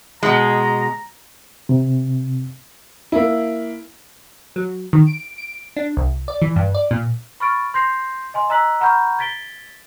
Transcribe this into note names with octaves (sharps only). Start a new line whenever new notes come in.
B2 G#3 A#5
C3
A#3 E4
F#3
D#3
D7
D7
D4
C2
D5
E3
G2
D5
A#2
B5 C#6 F6 A6 D7
C6 G6 A#6 C7 F7
D#5 G#5 C6
D#5 A#5 E6 F#6 B6 F#7
F#5 A#5 B5 C#6 F6 G6
G#6 A6 B6 D7 G7